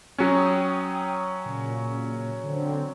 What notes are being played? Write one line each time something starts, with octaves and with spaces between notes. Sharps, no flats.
F#3 C#4 G5 D#6
A#2 C#3
D3 C4